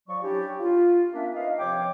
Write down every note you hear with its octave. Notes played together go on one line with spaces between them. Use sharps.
F3 F#3 D5 C#6
C#4 D4 E4 G4
F4
A#3 B3 C#4 D4 E5
D#4 B4 D#5 F5
C3 F3 C#5 G5 D6